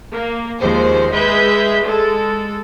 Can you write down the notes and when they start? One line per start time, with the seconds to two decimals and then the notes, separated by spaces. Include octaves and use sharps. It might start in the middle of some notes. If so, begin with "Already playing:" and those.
0.12 A#3
0.60 D#2 F3 G#3 C5
1.10 G#3 G#4 B4 E5 G6
1.84 G#3 A4